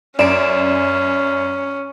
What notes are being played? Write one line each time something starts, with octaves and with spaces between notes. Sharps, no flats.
F#2 C#4 D5 D7 E7